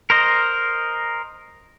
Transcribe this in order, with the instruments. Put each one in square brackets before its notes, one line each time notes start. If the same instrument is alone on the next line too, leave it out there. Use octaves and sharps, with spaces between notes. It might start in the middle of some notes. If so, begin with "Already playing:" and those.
[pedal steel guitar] A#4 C5 D#5